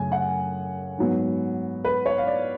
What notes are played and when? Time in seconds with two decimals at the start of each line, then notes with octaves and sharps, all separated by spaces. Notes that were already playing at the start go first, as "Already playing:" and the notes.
Already playing: F#2 C#3 A3 G#5
0.12 F#5
0.98 G#2 F#3 B3
1.85 B4
2.06 C#5
2.18 F5
2.26 D5